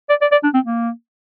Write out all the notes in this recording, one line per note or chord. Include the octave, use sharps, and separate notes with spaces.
D5
D5
D5
D4
C4
A#3